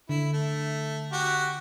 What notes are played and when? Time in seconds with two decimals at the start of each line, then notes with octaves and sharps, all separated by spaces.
0.09 D3 E4
0.33 A3
1.12 F#4 G4